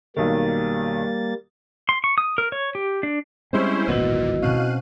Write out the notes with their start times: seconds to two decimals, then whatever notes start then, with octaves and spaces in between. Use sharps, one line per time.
0.16 B1 D#3 G3 A#3 A6
1.89 C6
2.04 C#6
2.18 D#6
2.38 A#4
2.52 C#5
2.75 G4
3.03 D4
3.53 G3 G#3 C4 C#4 E4 C5 C#6
3.88 D1 G#1 A#2 B3 E4 F#4 D#5
4.42 B2 C4 C#4 F5 F#6 D#7